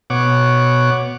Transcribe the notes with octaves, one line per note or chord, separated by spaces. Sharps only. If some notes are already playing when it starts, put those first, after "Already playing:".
B2 C#5 F#5 D6